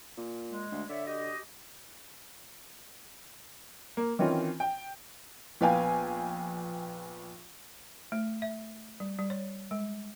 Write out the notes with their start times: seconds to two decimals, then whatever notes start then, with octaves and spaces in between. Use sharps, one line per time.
0.18 A#2
0.51 G#3
0.72 D2
0.89 D3 C#5 D5 E5
1.07 F#4 G4 D#5
3.97 A#3
4.19 D#3 E3 C4 C#4 F4
4.60 G5
5.61 A#1 B3 F5 G5 G#5
8.12 A3
8.42 E5
9.00 G3
9.19 G3
9.30 C#5
9.71 G#3